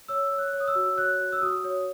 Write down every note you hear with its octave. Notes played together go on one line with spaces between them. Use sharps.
C#5 E6
C#5
F#6
C#5
D#6
E6
F#4
C#5 F#6
F#4
E6
F#4 D#6
C#5